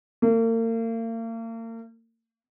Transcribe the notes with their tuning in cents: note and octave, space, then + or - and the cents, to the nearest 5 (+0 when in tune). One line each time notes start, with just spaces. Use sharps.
A#3 -40